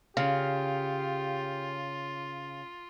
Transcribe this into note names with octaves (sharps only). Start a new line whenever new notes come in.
C#3 F4 G4 F5